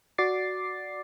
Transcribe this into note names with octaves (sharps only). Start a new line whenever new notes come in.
F#4 D5 D6 A6 C7